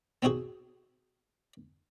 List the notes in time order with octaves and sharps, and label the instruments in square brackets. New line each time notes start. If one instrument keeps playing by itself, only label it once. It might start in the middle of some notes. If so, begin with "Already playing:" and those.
[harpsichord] B3 C4 D#4 F#4 G#4